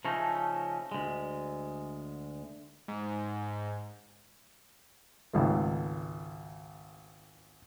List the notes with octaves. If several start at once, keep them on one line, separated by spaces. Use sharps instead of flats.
C#3 F3 A3 C#4 D#4
D2 G#3
G#2
G#1 C#2 A3